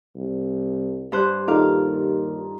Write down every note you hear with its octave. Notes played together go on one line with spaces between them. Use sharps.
C2
G2 C5 F#6
D#2 D#4 F4 A4 F5 D6